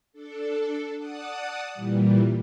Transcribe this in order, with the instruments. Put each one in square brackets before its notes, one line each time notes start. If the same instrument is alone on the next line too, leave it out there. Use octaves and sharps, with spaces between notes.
[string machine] D4 A4
D5 F#5 A5 D#6
A#2 E3 G3